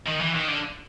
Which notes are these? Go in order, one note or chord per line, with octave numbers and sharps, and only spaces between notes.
D#3
E3
D#3
D3